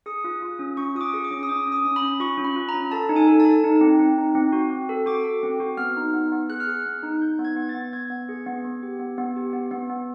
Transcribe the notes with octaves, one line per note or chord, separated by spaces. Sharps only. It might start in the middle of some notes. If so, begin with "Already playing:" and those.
G#4 D#6
F4
F4
C#4
C#4 C#6
F4 D#6
D6
G#4
D6
C#4
D#6
C#4 D6
C#4
D#6
C#4
B5
C#4
F4 C#6
C#4
B5
F4
A#5
C#4
A4 A5
D#4
G#5
A4
A5
A4
D#4
C4
C4
D#4
C4
F#4
C4
A4
F#4 D6
A4
C4
F#4
B3 F6
D#4
B3
B3
G#4 F#6
F6
G#4 F#6
B3
D#4
D#4 G6
B3
G#6
B3
A6
B3
B3 G#6
B3
G#4
B3
B3
G4
B3
B3
G4
B3
B3
B3